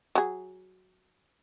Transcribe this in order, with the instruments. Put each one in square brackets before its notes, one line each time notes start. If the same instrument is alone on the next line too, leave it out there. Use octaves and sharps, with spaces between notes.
[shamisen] F#3 G#4